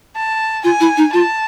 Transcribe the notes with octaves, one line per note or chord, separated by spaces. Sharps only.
A5
F4 G#5
E4
D#4
F4 A5